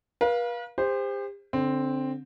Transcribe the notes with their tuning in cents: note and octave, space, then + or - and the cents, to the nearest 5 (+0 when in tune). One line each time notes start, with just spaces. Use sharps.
B4 -45 F5 +0
G4 +40 C5 -5
D3 -20 C4 +0